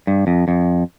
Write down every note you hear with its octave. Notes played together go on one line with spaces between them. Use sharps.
G2
F2
F2